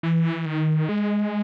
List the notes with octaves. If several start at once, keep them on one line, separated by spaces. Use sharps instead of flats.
E3
D#3
G#3